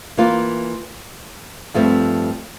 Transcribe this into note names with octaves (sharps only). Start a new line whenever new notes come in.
E3 A#3 F4
G2 F3 A3 C4